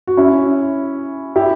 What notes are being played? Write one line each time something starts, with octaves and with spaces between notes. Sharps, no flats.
F#4
C#4 E4
E4 G4